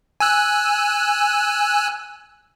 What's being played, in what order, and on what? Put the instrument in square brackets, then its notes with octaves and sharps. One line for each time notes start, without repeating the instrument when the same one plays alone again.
[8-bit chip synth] G#5 E6 F#6